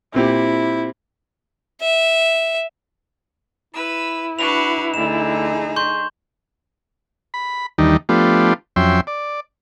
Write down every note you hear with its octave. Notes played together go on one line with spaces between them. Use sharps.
A#2 C4 E4 G4
E5
E4 B4 E6
D4 F#4 B4 F7
D2 D3 D#4 G#4 E7
C6 C#6 G6
B5
D#2 D#3 E3 G3 D4 D#4
F3 A3 B3 D4 F4 G4
F2 F#3 C#4 E5 G5 C6
D5